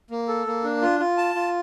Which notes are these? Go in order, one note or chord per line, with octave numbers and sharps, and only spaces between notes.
A#3
A4
A#3
D4
F4
F4
A5
F4